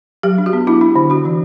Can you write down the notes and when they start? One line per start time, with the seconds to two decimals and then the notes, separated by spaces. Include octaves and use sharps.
0.23 F#3 G4
0.38 D4
0.46 F#4
0.53 B3
0.67 D4 E4
0.81 D4
0.96 D3
1.10 D4 F#4
1.25 E3